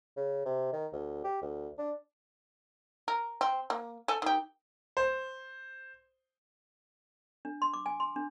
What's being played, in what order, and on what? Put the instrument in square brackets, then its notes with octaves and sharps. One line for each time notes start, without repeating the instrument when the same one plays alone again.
[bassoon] C#3
C3
D#3
D2
G4
D2
D4
[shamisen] A#4
C4
A#3
A4 G#5
D#3 G4
[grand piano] C5
[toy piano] D4
C6
D6
G#5
C6
D4